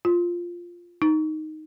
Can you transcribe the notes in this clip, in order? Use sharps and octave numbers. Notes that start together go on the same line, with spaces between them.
F4
D#4